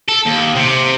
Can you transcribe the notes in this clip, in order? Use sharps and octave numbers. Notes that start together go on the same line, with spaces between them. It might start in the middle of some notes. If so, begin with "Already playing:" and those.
A4
D#2
C3